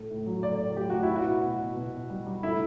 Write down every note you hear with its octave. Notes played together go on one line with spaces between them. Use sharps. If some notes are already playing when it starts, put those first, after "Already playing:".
Already playing: A2 A3
A2
F#3
A3 D5
A2
F#3 G4
A2 F#4
E4
B3
F#4
B2
B2
B3
B2
B2
G3
G3
A3 E4